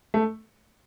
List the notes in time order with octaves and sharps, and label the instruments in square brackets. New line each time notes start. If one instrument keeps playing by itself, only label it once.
[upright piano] A3